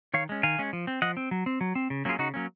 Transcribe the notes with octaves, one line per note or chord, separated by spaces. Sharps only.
D#3 C#5 F5
G#3 C#4
D#3 F5 G#5
G#3 C#4
F3
C4
F3 D#5 F#5
C4
F#3
C4
F#3
C4
C#3
F#3 A#3 C#4 F4 G#4
C#3 D#4 F#4
F#3 A#3 C#4